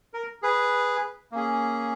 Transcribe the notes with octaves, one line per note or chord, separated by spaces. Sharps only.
A#4
G#4 B4
A#3 C#4 G#4